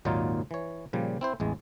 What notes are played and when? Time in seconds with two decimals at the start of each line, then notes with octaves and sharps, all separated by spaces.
0.05 G#1 D#2 A#2 F#3 D#4 F4
0.51 E3 C#5
0.93 A#2 C#3 F3 G3
1.21 C4 E4 C5
1.40 A1 E2 G#3